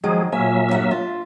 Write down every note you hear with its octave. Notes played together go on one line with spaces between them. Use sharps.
D#3 F3 F#3 G#3 G#4
A#2 F#3 A#3 E5 G#5
G2 G#4 F#5
F4